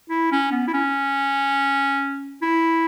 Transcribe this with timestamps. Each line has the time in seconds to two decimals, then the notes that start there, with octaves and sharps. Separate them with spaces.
0.10 E4
0.32 C#4
0.52 B3
0.67 E4
0.74 C#4
2.42 E4